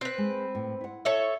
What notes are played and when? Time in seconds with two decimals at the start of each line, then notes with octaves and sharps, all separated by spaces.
0.01 C4 B4
0.18 G#3
0.55 A2
0.81 E4 F#5
1.05 A4 C#5 E5